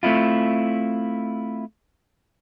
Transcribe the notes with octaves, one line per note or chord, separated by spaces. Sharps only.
A3 C4 E4 F4